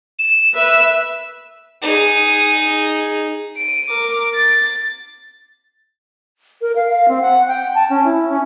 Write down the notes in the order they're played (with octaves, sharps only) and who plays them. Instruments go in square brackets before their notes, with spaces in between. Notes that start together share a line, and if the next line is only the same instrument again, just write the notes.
[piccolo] E7
[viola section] B4 E5
[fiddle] D#4 G#4
[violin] D7 D#7
A#4 D6
A6
[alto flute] A#4
F5
F5
C4
F#5
G5
A5
C#4
E4
C#4